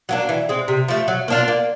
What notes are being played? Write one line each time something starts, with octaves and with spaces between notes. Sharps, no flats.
F#3 A#3 D4
E3
G#3 C4
C3
F3 A3
F#3
A#3 D4 F4
A#3